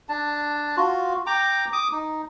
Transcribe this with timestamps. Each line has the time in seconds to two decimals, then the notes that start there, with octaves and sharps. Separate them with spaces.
0.09 D4 A5
0.77 F4 F#4
1.26 G5 A#5 D6
1.73 D6 D#6
1.92 D#4